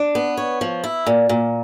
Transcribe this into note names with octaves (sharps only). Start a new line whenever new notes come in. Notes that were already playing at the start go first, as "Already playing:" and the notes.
Already playing: D4
B3
C#5
F3
E4
A#2
A#2